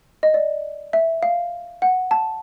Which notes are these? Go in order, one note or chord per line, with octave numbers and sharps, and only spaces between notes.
D#5
D5
E5
F5
F#5
A5